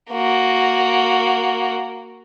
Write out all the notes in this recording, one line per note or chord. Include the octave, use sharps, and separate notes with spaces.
A#3 F#4